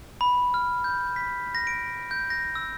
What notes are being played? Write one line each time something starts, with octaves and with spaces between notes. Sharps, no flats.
B5
F6
G6
B6
A#6
D7
G6
A#6
E6